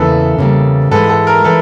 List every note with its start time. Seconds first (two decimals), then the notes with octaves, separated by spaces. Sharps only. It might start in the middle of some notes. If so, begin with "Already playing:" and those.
Already playing: E2 C#3 E3 A#3 A4 B4
0.38 E2 C#3 E3 G3 A#3
0.91 G#2 E3 G#3 A4 B4
1.09 A4
1.27 A#4
1.44 E3 G#3 A4 B4